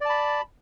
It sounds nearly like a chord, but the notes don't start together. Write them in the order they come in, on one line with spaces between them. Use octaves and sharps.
D5 A5 B5